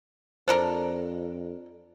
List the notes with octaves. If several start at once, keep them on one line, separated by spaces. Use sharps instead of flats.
F2 D4 A4 A#4 C5